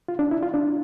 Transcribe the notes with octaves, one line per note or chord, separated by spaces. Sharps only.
F4
D4
E4
F4
D4